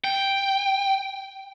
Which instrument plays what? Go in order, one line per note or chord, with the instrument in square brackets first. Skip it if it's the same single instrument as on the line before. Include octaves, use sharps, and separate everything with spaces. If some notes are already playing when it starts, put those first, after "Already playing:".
[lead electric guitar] G5